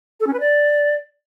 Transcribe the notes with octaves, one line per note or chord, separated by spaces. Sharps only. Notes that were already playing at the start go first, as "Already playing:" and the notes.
A4
C#4
B4
D5